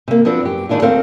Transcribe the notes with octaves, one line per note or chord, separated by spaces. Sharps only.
C3 A#3
F3 B3 C4 D4 F#4
F#2 G4
D#3 G#3 D4 E4 F4
D2 C4 A4 A#4 C5 F5